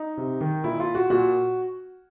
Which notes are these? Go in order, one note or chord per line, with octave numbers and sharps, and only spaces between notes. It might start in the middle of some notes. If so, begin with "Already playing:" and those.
Already playing: D#4
C3
D#3
A#2 E4
F4
F#4
A#2 F#4